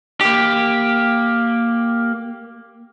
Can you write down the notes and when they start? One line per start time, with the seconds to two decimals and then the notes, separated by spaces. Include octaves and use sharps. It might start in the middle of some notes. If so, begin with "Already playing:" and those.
0.21 A#3 G4